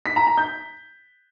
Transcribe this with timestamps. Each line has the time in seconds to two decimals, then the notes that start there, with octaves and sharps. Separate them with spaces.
0.06 B6
0.16 A#5
0.27 A#5
0.37 G6